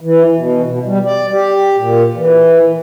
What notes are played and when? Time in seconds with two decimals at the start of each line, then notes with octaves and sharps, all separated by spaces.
0.01 E3
0.36 B2
0.64 B2
0.86 G3
1.05 D5
1.32 G4
1.76 A#2
2.15 E3